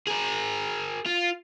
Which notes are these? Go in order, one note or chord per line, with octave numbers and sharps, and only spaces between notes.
G#4 A#4
F4